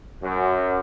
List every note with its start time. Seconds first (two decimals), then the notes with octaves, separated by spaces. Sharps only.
0.23 F#2